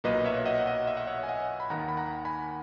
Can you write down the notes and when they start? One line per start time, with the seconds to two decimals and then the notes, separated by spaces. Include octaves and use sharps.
0.04 B1 A#2 F#3 A#3 B4 D#5
0.25 C#5 E5
0.46 D#5 F#5
0.66 D#5 F#5
0.87 E5
0.97 F#5
1.07 C#5 E5
1.23 G#5
1.28 D#5 F#5
1.60 B5
1.70 D#2 D#3 A#3 F#5 A#5
1.89 B5
1.97 F#5 A#5
2.25 G#5 B5